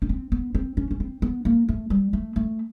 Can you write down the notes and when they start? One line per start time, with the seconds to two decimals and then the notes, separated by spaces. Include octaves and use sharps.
0.02 C#4
0.09 C4
0.32 B3
0.55 C4
0.77 C#4
0.91 C#4
1.00 C4
1.22 B3
1.45 A#3
1.68 A3
1.90 G3
2.13 A3
2.36 A3